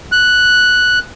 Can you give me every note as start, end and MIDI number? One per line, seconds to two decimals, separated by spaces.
0.12 0.99 90